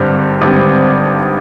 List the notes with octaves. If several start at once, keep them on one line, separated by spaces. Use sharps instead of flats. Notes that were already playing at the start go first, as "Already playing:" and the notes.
Already playing: G#1 G2 D3 G3 C4
G#1 G2 D3 G3 C4